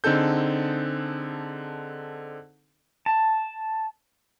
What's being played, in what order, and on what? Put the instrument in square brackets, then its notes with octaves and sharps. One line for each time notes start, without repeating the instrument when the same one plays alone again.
[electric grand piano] D3 C4 D#4 G#4 A4 G6
[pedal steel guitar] A5